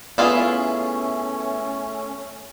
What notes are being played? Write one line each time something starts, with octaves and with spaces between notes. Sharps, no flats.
A3 B3 C#4 E4 F4 G#4